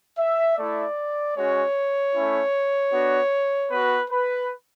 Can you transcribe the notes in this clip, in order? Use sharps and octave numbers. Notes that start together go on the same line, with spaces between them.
E5
A3 E4 D5
G#3 C#4 F#4 C#5
A3 C#4 E4
B3 D4 F#4
B3 F#4 B4
B4